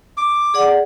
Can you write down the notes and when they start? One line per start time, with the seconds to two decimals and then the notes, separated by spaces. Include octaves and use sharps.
0.17 D6
0.54 G#4 D5 F#5